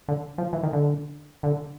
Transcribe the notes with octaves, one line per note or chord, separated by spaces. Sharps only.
D3
F3
E3
D#3
D3
D3